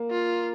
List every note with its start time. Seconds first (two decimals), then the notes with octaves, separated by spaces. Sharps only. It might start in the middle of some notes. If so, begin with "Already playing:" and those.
Already playing: A#3
0.11 F4